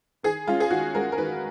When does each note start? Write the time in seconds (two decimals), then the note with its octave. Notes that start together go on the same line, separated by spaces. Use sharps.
0.23 D#3 G#4
0.47 G#3 C#4 F4
0.60 G#4
0.70 D#3 F#4
0.95 G#3 C#4 A#4
1.12 A#4
1.17 D#3 B4